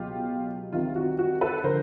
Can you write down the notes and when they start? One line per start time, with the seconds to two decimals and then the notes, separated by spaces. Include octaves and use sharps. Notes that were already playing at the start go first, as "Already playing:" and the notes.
Already playing: C#2 B2 F#3 F4 G4
0.73 C2 C3 D#3 F4
0.96 F#4
1.19 F#4
1.41 A4 B4
1.64 D3 F3 A#4 C5